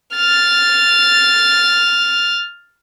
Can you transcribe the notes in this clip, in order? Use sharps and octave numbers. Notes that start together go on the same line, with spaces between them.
F6 A6